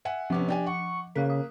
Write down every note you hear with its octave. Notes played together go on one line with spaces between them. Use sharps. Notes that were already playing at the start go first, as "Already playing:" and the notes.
E5 F#5 G#5
C3 F3 B3 C#4 D6
D4 G4 G#5
F#5 C#6
C#3 A#3 F5 F#6 B6
D#6